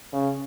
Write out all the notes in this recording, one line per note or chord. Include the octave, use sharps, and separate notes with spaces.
C#3